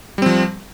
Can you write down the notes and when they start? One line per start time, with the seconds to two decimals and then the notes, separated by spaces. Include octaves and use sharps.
0.18 G3
0.22 C4
0.26 F3